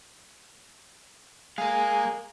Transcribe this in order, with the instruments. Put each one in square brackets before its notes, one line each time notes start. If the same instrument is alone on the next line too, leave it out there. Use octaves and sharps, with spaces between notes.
[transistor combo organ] G#3 [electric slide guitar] A#4 F5